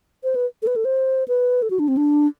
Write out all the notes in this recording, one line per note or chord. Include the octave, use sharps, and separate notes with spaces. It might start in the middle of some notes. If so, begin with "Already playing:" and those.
C5
B4
A4
B4
A4
C5
B4
A4
F#4
D4
C4
D4